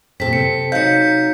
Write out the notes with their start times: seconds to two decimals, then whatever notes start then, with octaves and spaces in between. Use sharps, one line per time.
0.20 F#2 A#2 C4 A4 B6
0.33 C3 C#7
0.72 F#3 D#4 F5 G6 C#7